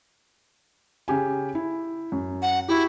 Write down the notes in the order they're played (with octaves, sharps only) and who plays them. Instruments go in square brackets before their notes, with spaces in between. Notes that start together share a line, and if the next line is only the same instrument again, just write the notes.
[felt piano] C#3 G4 G#5
E4
F#2
[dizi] F#5
[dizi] E4 [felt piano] F#4 G4